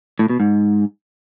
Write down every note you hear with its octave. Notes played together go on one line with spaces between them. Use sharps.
A2
B2
G#2